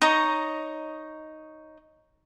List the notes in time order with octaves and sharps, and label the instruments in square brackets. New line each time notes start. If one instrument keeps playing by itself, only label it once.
[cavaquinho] D#4 C#5 D#5 A#5